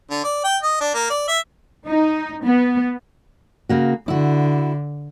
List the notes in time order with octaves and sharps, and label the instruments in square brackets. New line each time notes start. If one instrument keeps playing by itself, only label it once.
[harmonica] D3
D5
G5
D#5
D4
A#3
D5
E5
[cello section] D#4
B3
[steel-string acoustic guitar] C#3 A#3 F#4
[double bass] D3 [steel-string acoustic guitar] E4 F#4